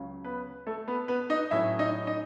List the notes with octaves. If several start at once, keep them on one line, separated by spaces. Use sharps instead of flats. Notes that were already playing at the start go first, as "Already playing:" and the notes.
Already playing: C#2 C#3 F#3
B3 B4
A3 A4
B3 B4
B3 B4
D#4 D#5
A2 F#3 C#4 E4 E5
D#4 D#5
D#4 D#5